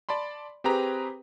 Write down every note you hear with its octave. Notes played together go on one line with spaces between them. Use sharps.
D5 A5 B5 C6
C4 G4 G#4 B4 A#5